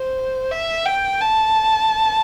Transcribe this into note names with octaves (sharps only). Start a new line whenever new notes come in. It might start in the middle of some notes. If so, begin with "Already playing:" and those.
Already playing: C5
E5
G5
A5